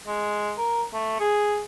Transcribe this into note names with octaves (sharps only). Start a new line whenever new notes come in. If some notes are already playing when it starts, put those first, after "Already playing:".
G#3
A#4
A3
G#4